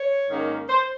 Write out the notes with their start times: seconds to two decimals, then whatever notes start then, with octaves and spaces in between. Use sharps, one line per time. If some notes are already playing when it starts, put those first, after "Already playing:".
Already playing: C#5
0.28 G#2 D#3 A#3 C#4
0.68 C5